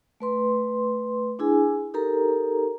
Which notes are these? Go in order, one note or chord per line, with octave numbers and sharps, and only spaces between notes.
A3 B4 C6
D4 E4 G#4 G#5
D#4 G4 A4 A#4 A#5